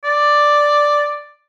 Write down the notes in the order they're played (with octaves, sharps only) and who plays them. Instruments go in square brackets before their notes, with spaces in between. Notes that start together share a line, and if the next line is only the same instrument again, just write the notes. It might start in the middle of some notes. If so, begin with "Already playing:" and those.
[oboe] D5